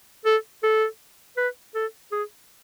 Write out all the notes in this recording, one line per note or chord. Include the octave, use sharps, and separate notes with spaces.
A4
A4
B4
A4
G#4